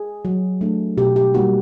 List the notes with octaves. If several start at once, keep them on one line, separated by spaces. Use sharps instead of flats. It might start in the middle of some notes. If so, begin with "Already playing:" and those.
Already playing: G#4
F#3
A3 D4
B2 G4
G4
G3 A#3 D#4 F#4